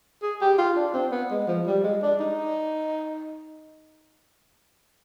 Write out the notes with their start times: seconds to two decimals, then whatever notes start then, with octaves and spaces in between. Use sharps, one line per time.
0.22 G#4
0.41 G4
0.58 F4
0.76 D4
0.94 C4
1.12 B3
1.31 G#3
1.48 F3
1.67 G3
1.84 G#3
2.03 D4
2.20 D#4